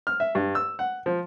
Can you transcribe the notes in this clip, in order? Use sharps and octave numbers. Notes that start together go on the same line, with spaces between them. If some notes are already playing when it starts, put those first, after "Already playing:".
F6
E5
G2
E6
F#5
F3